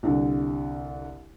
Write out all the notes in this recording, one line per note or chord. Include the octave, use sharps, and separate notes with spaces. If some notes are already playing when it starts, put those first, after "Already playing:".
C2 D3